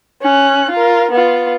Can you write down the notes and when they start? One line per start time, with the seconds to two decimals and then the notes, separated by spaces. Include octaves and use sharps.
0.22 C#4 F#6
0.71 F4 A#4
1.11 B3 F4